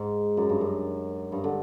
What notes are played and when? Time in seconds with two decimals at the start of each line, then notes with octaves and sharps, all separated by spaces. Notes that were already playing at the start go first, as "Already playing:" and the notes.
Already playing: G#2
0.37 F#2
0.49 G2
0.61 F#2
1.32 G2
1.44 D3